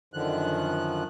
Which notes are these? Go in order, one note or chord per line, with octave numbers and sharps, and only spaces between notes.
F#2 D3 D#3 F3 F#6